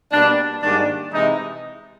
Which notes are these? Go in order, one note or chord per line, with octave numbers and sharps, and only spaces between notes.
B2 G3 A#3 D4
G#2 D#3 G3 A#3 D4
C3 E3 G#3 D#4